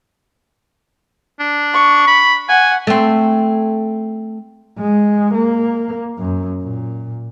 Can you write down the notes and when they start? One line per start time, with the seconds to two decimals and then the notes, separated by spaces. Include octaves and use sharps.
1.40 D4
1.74 C#6
2.07 B5
2.49 F#5 G#5
2.87 A3 C4
4.79 G#3
5.34 A#3
6.18 F#2
6.61 A#2